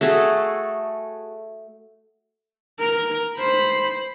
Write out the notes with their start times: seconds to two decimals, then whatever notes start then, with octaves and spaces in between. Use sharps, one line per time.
0.01 A3 F#4 G#4 A4
2.79 A#4
3.37 C5 B5